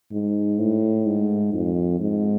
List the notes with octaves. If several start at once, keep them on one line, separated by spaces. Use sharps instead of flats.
G#2
A2
G#2
F2
G#2